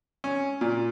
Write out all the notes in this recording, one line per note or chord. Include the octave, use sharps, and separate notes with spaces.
C#4
A#2